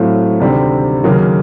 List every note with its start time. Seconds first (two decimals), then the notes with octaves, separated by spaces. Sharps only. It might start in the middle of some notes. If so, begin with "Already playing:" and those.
Already playing: A2 F#3 A3 C4 F4
0.40 D2 C3 D#3 G3 C4
1.04 D#2 C#3 F#3 A#3